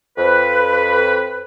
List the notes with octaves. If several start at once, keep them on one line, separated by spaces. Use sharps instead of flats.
F2 B4